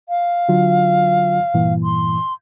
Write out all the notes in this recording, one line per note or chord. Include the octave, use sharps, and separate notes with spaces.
F5
D3 F#3 F4
G2 A#2 E3
C6